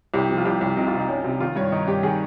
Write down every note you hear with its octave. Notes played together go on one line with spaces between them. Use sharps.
C2 G4
F3
F4
C2 G4
C2
C3 D#4
F4
C3
D#4
C2 C#4
C3
D#3 F4
G2 C#5
D#3 D#4
G2 G4
D#3 G#4